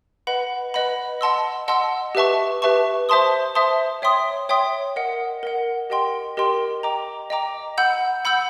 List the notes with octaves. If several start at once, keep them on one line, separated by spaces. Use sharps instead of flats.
B4 D#5 F#5 B5
B4 D#5 F#5 B5
D#5 F#5 A5 C6 E6
D#5 F#5 A5 C6 E6
G4 B4 E5 A5 C#6
G4 B4 E5 A5 C#6
C5 E5 A5 C6 D#6
C5 E5 A5 C6 D#6
C#5 E5 G5 C6 D#6
C#5 E5 G5 C6 D#6
A#4 D#5 F#5
A#4 D#5 F#5
G4 A#4 D#5 G5 C6
G4 A#4 D#5 G5 C6
D#5 G5 A#5 D6
D#5 G5 A#5 D6
F#5 B5 E6 G6
F#5 B5 E6 G6